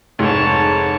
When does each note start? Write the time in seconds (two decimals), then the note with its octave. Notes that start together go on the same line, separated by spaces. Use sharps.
0.19 F1 G#2 C#5 A5